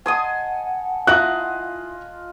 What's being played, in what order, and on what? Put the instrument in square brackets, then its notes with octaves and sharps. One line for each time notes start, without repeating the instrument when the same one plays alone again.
[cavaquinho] D#5 C6 [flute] F#5 [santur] G#5 A5 D#6
[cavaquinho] E4 F5 A#5 [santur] F4 D#5 [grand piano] F#6 F#7